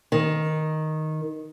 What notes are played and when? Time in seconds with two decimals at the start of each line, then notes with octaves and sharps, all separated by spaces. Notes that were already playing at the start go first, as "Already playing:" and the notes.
0.12 D#3